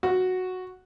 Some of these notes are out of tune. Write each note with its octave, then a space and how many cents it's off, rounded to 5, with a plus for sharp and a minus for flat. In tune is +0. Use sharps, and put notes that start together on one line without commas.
F#4 -5